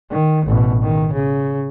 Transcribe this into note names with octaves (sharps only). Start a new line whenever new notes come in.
D#3
A1 B2
D#3
C#3